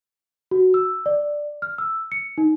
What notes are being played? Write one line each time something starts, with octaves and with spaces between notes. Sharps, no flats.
F#4
E6
D5
F6
E6
C#7
D#4